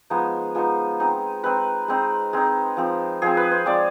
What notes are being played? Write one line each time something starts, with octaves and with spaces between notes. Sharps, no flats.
F3 G#3 B3 D#4
F3 G#3 B3 D#4
G#3 C4 D#4
G#3 C4 D#4 B4
G#3 C4 D#4
G#3 C4 D#4
F3 G#3 C4
F3 G#3 C4 G#4
B4
C5
F3 G#3 C4 D5